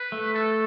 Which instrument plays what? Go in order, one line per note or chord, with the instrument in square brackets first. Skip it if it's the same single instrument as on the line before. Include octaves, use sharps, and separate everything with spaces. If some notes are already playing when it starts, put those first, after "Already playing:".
Already playing: [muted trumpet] B4
[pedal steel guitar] A3
[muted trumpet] A4